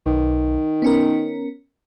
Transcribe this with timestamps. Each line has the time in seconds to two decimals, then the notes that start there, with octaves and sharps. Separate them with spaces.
0.06 B1 D#3
0.82 B3 C#4 A#4